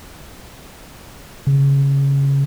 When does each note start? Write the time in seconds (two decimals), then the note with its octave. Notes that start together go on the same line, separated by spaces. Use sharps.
1.47 C#3